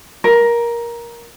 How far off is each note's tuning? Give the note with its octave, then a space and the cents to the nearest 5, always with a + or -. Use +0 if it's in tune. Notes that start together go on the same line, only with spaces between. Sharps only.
A#4 +15